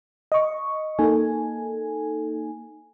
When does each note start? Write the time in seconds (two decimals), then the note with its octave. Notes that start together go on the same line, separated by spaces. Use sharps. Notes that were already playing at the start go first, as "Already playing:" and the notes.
0.32 D#5 C#6
0.99 A#3 D#4 A4 G#5